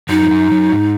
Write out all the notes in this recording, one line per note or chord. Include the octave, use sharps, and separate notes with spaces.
F#2 F#3 D#4
F3
F#2 F#3
F#2 F#3
G#2